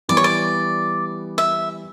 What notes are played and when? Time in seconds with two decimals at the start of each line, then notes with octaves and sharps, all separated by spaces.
0.09 E3 G3 B3 D5
0.17 C#5
0.24 D5
1.38 E5